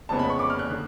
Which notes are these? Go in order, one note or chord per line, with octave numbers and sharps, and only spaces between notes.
F1 F2 C#3 G#3 B3 A5
B5
C#6
D6
F6
F#6
D3